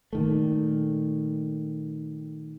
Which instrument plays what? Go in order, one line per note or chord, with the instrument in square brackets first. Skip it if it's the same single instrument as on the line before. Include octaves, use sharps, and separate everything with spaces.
[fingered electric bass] A#2 D#3 A3